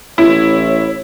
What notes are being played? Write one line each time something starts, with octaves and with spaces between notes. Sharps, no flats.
A1 E4 C#5